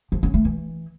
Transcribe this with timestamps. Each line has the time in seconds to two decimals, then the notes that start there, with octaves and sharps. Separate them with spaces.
0.12 F3
0.23 C#4
0.34 A3
0.45 E3